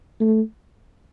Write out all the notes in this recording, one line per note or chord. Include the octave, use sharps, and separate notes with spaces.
A3